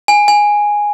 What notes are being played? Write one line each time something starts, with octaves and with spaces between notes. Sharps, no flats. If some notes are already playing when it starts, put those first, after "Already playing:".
G#5
G#5